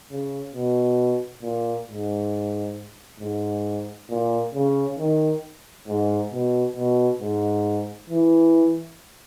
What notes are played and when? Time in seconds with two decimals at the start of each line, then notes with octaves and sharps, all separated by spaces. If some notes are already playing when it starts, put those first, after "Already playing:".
0.10 C#3
0.54 B2
1.42 A#2
1.88 G#2
3.20 G#2
4.10 A#2
4.54 C#3
4.98 D#3
5.88 G#2
6.32 B2
6.76 B2
7.20 G#2
8.10 E3